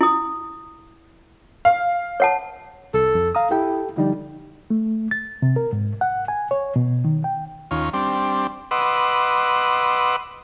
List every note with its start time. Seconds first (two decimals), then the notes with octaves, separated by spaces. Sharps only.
0.01 E4 D#6
1.65 F5
2.20 C#5 F#5 A5
2.94 C2 A4
3.15 F2
3.35 F5 A#5 D#6
3.51 E4 G4 A4 G5
3.97 D3 F3 G3 D#4
4.70 A3
5.11 A6
5.42 C3
5.56 A#4
5.73 G#2
6.01 F#5
6.28 G#5
6.51 C#5
6.76 B2
7.05 D#3
7.24 G5
7.71 D#2 C#4 F4
7.93 G3 C4 D4
8.71 B4 D#5 F#5 C6 D6 E6